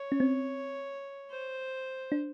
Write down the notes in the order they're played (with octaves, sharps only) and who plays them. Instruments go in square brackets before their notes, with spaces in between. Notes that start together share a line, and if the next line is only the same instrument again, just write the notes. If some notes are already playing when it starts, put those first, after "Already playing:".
Already playing: [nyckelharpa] C#5
[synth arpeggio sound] C#4
C4
[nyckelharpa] C5
[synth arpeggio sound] D4